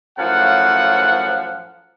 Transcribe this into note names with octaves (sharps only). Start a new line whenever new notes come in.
F#2 A2 F3 F5 F#5